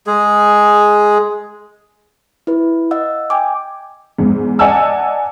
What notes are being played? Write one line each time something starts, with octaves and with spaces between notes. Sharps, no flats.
G#3 G#4
E4 B4
D#5 F5 F#5 E6
G5 G#5 D6
E2 G#2
D5 D#5 F#5 G#5 A5 E6